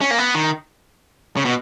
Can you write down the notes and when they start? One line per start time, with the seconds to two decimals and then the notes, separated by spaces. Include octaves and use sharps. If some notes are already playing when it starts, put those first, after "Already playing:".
0.01 C#4
0.11 A#3
0.18 B3
0.35 D#3
1.37 C#3
1.45 B2